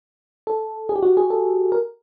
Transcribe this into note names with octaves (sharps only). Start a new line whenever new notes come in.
A4
G#4
G4
F#4
G#4
A4
A#4